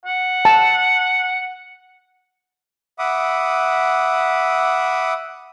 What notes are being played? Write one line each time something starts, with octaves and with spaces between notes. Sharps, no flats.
F#5
A5
E5 F#5 B5 D6 D#6